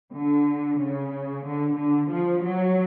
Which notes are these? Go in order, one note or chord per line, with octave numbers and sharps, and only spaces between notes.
D3
C#3
D3
D3
F3
F#3